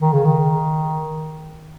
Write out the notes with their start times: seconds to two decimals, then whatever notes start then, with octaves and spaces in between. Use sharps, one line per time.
0.01 D#3
0.13 C#3
0.25 D#3